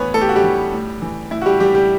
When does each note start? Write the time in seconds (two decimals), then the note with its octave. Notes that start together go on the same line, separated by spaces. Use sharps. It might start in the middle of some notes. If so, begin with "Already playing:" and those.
Already playing: A2 E3 B3 B4 C#5
0.14 A2 A4
0.21 G4
0.29 F#4
0.35 G3 G4
0.44 E3
0.73 A2
1.02 E3
1.31 A2 E4
1.42 F#4
1.46 G3 G4
1.60 E3 G3 G4
1.75 G3 G4